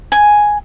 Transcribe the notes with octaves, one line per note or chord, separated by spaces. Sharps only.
G#5